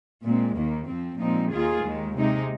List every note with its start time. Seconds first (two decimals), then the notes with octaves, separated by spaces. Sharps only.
0.24 A#2 G#3 C4
0.56 D#2 D#3 A#3
0.87 F2 F3 C4
1.19 A#2 F3 G#3 C4 D#4
1.51 D#2 D#3 A#3 F4 G#4
1.83 D#2 D#3 G#3
2.15 C3 G#3 D#4